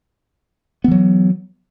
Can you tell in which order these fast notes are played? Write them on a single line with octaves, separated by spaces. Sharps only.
B3 E3 F#3